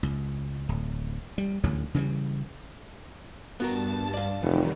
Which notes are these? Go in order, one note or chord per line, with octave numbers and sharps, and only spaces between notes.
C#2
D1
G3
A1 D2 D3 F#3
C#3 E3 F#3 G3
G2 B3 F#4 A#4 A5 A6
D5 F5
F1 D#3 E3 F#3 G3